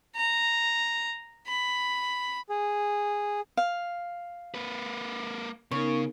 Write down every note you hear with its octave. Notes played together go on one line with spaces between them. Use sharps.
A#5
B5
G#4
F5
A#3 B4
C#3 B3 D#4 A#4 C#5